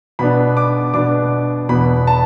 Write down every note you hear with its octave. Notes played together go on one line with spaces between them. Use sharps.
B2 B3 D4 B5
D6
B2 B3 D4 D6
E2 B2 B3 B5
A5